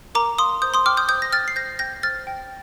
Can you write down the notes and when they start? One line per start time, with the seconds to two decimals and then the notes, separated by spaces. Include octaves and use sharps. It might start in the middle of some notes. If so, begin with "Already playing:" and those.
0.15 A#4 A#5 D6
0.38 F5 C6 D#6
0.62 C5 D#6 G6
0.74 C6 D#6
0.86 G5 D6 F6
0.97 D#6 G6
1.09 C5 D#6 G6
1.22 A#6
1.32 G5 F6 A6
1.48 C7
1.56 C5 G6 A#6
1.79 G5 G6 A#6
2.03 C5 F6 A6
2.27 G5